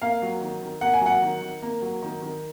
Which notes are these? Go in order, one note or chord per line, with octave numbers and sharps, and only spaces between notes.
A#3 F5
F#3
D#3
D#3
A#3 F#5
G#5
F#3 F#5
D#3
D#3
A#3
F#3
D#3
D#3